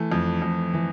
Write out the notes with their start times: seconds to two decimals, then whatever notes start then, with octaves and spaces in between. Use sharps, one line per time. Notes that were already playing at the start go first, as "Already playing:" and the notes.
Already playing: E3 A3
0.12 F2
0.42 F2
0.74 E3